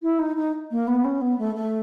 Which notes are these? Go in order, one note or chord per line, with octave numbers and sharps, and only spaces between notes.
E4
D#4
D#4
A#3
B3
C#4
B3
A3
A3